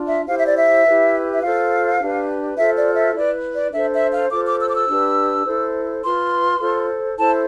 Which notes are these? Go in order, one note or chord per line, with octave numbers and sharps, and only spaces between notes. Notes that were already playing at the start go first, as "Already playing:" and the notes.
Already playing: D4 F4
E5
E4 G4 C5 F5
E5
D5
E5
E4 G4 B4
E5
F4 A4 C5 F5
D4 G4 B4
F4 A4 C5 E5
D5
E5
E4 B4 D5
D5
D4 A4 C5 E5
E5
F5
F4 A4 C5 D6
D6
E6
D6
E6
D4 G4 B4
E4 A4 C5
F4 B4 C6
F4 A4 C5
E4 A4 C5 A5